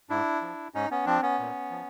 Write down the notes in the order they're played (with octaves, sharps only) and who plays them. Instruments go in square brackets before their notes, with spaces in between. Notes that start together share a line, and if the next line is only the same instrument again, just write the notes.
[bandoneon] G#2 D4 E4
F3
G#2 C#4 D#4
B3 C#4
F3 C4 D4
B3 C#4
A#2
F3